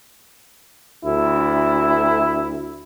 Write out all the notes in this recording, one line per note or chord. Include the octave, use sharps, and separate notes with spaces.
D2 E4